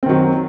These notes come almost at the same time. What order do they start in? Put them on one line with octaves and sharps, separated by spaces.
C4 D#3 F#3